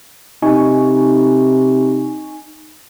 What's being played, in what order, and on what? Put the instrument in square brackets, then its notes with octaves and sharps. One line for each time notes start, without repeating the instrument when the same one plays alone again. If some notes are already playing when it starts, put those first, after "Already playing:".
[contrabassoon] C3 [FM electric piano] D#4 G#5 C#6